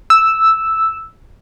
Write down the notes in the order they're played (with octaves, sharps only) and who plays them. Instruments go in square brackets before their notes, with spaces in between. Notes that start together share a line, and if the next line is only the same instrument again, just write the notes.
[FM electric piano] E6